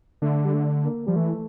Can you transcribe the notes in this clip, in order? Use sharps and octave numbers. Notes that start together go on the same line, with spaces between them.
D3 A3
G3
A3
A#3
F3 G3
E3 A3